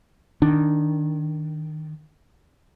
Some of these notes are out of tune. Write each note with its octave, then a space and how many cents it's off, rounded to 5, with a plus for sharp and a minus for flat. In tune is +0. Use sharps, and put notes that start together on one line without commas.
D#3 +0 D4 +0